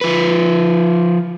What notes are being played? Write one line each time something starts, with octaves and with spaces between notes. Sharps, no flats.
F3 B4